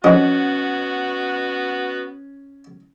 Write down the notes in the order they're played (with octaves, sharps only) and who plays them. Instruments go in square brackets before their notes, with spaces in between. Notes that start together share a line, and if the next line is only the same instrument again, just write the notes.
[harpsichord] F2 D#5 [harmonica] B3 F#4 [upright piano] C#4